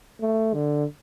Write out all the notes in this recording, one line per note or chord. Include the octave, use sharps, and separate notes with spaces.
A3
D3